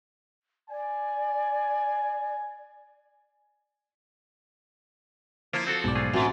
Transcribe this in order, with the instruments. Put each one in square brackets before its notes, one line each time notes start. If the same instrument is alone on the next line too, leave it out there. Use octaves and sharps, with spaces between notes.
[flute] D5 [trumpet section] G#5
[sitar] F3 [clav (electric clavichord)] A#3 E4 F4
[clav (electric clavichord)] C4 F#4 A4
[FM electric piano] B1 D5 [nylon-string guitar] G#2
[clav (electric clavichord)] A3 F4 G#4
[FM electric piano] A1 A6 [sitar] F#2 [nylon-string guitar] C4 D4 F#4